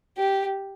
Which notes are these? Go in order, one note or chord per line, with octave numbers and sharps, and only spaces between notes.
G4